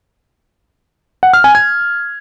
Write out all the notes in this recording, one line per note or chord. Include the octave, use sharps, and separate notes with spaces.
F#5
F6
G#5
G#6